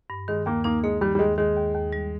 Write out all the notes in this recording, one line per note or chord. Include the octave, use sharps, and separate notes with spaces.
G2
D#3 G#3
D#2 A#3
A#3 D#4
G#3 A#3
D#3 G3
G3
D#2 G#3
D#3 G#3
D#2
D#2
G3